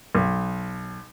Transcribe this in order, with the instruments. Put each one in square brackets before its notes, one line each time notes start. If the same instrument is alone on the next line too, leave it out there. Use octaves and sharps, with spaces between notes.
[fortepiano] B1